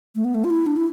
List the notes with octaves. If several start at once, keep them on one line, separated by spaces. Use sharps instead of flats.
A3
B3
A3
F4
E4
D4
E4